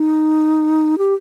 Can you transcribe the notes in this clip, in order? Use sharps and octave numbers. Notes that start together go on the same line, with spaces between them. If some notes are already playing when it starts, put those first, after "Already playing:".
Already playing: D#4
G4